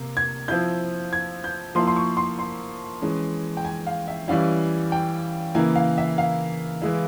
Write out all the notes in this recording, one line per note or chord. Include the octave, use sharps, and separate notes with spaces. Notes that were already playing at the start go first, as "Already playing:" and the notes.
Already playing: C3 A#3
G#6
F3 C4 E4 G6
G#6
G6
F3 A#3 E4 C6
C6
C#6
C6
C6
E3 G#3 C#4
G5
G#5
F5
E5
E3 G3 C#4 E4 F5
G5
C#3 E3 A#3 E4 G#5
F5
E5
F5
E3 G#3 E4